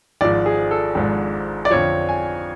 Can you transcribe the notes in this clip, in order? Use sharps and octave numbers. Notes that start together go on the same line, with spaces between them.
G#1 G#2 F3 D5
G#4
A4
G#1 G#2 F3
D5
F2 D3 F3 C#5
G#5